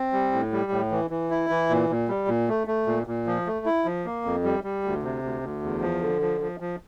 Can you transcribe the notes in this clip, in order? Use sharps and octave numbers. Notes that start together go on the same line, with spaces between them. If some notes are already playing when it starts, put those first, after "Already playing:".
Already playing: C4
G3
A2
G3
A2
E3
E3
E4
E3
A#2
A#2
G3
A#2
A3
A3
A#2
A#2
F3
A3
E4
F3
A#3
F2
G3
G3
D2
C3
D2
D2
E2
F3
D3
F3
F3
F3